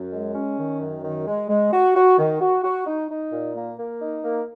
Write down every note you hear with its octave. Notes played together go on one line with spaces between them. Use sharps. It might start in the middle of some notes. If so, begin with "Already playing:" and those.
Already playing: F#2
G#3
C#4
D#3
F#2
D#3
G#3
G#3
F#4
F#4
D#3
F#4
F#4
D#4
D#4
A#2
A#3
A#3
D#4
A#3